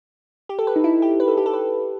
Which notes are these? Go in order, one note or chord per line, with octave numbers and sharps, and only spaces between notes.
G4
A4
B4
D#4
E4
G4
B4
A4
G4
A4
B4